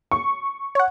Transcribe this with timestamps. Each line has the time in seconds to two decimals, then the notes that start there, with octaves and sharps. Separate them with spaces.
0.12 C#6
0.75 C#5 F#5